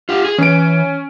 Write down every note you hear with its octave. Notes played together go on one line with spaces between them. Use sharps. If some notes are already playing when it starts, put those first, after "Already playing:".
F4 G4
G#4
E3 C#4 D7